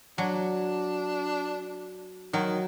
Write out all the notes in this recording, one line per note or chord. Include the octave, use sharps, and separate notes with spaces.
F#3 D4
D#3 F#3